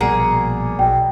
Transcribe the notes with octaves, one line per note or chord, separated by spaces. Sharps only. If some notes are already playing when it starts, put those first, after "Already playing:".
A#1 B2 G3 A#3 G#4 F#5
B1 B2 G5